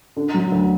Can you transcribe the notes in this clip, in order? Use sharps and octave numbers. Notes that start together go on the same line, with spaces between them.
D3
F#3
D2